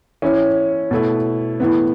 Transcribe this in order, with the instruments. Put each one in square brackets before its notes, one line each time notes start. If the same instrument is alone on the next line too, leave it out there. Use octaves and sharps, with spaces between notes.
[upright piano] E3 C#4 E4 C#5
B2 A3 E4
A2 E3 B3